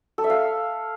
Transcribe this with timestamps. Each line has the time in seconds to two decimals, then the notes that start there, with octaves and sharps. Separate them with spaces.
0.18 A4
0.24 E5
0.30 F5